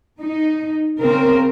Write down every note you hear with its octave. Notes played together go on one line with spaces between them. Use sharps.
D#4
C#3 C4 A#4